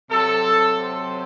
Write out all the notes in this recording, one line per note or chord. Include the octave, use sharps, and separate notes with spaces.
C3 F#3 C4 A4
C5